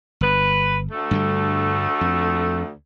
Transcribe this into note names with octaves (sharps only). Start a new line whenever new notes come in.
G1 B4
D2 A3
G2 D3 G3
F2